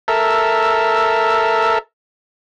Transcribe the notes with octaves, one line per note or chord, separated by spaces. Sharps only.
A4 A#4 E5